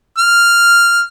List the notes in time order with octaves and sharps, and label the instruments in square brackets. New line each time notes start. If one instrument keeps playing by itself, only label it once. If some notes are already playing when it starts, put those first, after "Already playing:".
[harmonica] F6